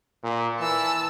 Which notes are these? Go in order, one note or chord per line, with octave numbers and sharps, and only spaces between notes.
A#2
E3 A5 E6